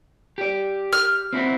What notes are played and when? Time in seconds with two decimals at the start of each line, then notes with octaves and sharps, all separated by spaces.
0.38 G4 D5
0.93 F6
1.33 C4 E4 F#4